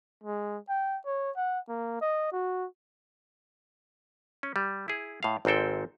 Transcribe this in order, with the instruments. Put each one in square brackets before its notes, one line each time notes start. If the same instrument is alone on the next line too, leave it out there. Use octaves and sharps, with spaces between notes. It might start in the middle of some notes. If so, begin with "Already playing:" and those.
[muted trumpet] G#3
G5
C#5
F#5
A#3
D#5
F#4
[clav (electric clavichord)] C#4
G3
E4 G#4
A2 F5
G#1 G#2 C4 A4 G5